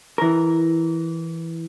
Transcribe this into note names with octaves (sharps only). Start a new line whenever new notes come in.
E3 A#4